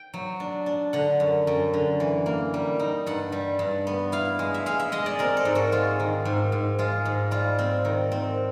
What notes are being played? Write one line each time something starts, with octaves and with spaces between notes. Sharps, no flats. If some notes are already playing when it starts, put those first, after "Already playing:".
Already playing: G5
F#3
D4
D4
D3 F#5
F#2
F#2
D3
E3
A#3
G3
D#4
G2 F#5
G3
G2
B3
E4 F5
G#3
E5
G#3 F5
E5
G#3 D#5
D5
C4 A#4
A4
G#2
F#4
G#3 F4
D#3
G#2
G#2
G#3 F4
G#2
G3 F4
C4
D#3
C4